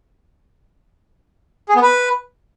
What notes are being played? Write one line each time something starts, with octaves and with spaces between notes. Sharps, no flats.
G#4
B3
B4